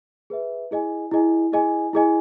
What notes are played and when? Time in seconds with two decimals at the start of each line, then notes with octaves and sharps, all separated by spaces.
0.30 G#4 B4 E5
0.71 E4 G#4 D#5 G#5
1.11 E4 G#4 D#5 G#5
1.52 E4 G#4 D#5 G#5
1.93 E4 G#4 D#5 G#5